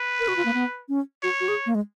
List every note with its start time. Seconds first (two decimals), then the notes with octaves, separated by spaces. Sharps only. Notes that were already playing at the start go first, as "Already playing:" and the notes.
Already playing: B4
0.20 A#4
0.28 F#4
0.37 F4
0.45 A#3
0.54 B3
0.89 C#4
1.23 F#4 C#5
1.40 F#4
1.48 G#4
1.66 A#3
1.75 G#3